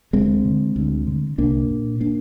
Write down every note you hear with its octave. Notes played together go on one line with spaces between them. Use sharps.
D2 G#3 C4
D3
D2
D3
C2 A#3 D4
A#2
A#3 D4